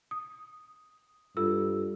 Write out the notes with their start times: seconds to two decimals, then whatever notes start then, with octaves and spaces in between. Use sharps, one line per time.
0.11 D#6
1.37 G2 F4 A4 E6